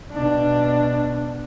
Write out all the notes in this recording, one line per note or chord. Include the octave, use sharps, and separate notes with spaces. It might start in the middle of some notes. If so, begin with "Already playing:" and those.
B2 D4